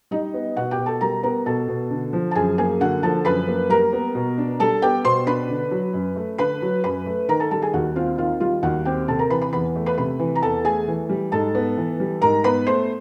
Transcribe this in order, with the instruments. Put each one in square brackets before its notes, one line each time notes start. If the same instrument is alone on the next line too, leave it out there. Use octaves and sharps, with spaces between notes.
[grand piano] G3 [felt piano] D#4 D#5
[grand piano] B3
[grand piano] B2 [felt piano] F#4 F#5
[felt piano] G4 G5
[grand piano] B2
[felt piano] A4 A5
[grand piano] G3 [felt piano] A#4 A#5
[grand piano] B3 [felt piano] A#4 A#5
[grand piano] B2 [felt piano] A4 A5
[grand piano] B2
D3
F3
[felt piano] A5
[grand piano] F#2 [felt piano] G#4 G#5
[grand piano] A#3 [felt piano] G#4 G#5
[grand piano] D3 [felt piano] F#4 F#5
[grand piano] F3 [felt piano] A4 A5
[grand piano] F#2 [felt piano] B4 B5
[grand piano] A#3
[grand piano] G3 [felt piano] A#4 A#5
[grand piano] B3
B2
D4
[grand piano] G3 [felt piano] A4 A5
[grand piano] B3 [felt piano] G4 G5
[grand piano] B2 [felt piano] C5 C6
[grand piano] D4 [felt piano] B4 B5
[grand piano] D3
F#3
F#2
A3
[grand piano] D3 [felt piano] B4 B5
[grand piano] F#3
[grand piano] F#2 [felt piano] B4 B5
[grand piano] A3
[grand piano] D#3 [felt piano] A#4 A#5
[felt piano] A4 A5
[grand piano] G3 [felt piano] A4 A5
[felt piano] G#4 G#5
[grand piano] D#2 [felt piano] F#4 F#5
[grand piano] C4 [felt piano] F4 F5
[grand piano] D#3 [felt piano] F4 F5
[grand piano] G3 [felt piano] F4 F5
[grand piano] D#2 [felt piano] F#4 F#5
[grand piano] C4 [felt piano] G4 G5
[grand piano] C3 [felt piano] A4 A5
[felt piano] A#4 A#5
[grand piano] E3 [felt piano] B4 B5
[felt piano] B4 B5
[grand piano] E2 [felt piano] B4 B5
[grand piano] A3
[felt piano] B4 B5
[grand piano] C3 [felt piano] B4 B5
[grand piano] E3
[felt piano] A#5
[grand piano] E2 [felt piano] A4 A5
[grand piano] A3 [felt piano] G#4 G#5
[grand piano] E3
G3
[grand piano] G#2 [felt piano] A4 A5
[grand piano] B3
E3
G3
[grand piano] G#2 [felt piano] A#4 A#5
[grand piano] B3 [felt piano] B4 B5
[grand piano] A3 [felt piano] C5 C6